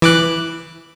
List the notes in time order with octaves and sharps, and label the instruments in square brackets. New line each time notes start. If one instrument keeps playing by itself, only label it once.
[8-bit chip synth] E3 D6 F#6